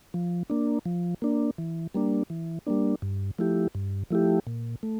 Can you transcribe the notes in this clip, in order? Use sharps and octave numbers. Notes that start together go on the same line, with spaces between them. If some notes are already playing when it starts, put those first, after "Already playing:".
F3
A#3 D4
F3
A#3 D4
E3
G3 A#3 D4
E3
G3 A#3 D4
G2
F3 A3 E4 G4
G2
F3 A3 E4 G4
A#2
A3